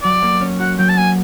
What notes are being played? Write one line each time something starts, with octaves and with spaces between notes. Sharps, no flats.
F#3 D5
A#3
C#4
F#4 F#5
F#3 G5
A5
A#3 G#5